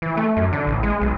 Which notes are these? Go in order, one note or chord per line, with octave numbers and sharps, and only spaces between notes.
E3
A3
F#2
D3
A1
G#3
B1